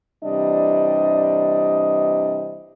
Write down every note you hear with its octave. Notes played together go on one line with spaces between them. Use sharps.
C3 E3 G3 D4 D#5